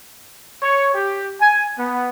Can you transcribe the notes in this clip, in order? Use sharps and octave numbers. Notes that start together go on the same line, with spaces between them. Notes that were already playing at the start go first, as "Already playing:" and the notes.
C#5
G4
G#5
B3